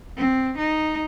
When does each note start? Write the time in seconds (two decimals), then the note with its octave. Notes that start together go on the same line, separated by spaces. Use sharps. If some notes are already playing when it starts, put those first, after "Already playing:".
0.18 C4
0.58 D#4